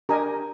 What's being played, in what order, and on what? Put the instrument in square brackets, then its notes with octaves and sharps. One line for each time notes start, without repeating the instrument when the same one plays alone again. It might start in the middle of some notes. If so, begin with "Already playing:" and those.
[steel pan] D4 G4 A#4 D#5 G#5 [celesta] A#5